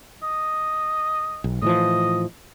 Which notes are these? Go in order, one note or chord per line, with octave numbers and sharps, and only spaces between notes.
D#5
B1
A2 E3 F3 D#5